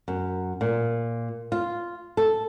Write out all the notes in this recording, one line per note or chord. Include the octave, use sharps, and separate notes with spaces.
F#2
A#2
F4
A4